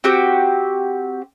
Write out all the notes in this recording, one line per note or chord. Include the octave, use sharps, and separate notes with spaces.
C4 F#4 G4